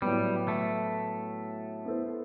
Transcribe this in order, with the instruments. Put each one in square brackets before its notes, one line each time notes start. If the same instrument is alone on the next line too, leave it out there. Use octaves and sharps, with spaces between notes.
[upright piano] A2 F#3 B3 [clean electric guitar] G3
[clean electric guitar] A3
[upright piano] B3 E4 A4 C5